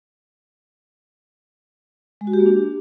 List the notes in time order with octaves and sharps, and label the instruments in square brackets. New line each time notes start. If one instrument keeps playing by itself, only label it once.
[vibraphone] G#3
F#4
G4
A#3
D4